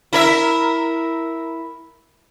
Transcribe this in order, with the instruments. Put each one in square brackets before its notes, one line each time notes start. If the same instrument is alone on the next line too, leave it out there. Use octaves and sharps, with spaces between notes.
[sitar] E4 A#4 E5